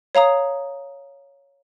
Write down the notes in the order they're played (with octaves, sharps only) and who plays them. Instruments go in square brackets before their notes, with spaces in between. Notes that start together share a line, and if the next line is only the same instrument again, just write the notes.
[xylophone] C#5 F5 A#5 D#6